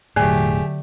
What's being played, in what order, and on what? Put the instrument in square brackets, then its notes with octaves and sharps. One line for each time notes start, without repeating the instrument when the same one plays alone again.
[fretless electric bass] E1 A2 [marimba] D3 [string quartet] F#3 A3 G4 [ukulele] G#4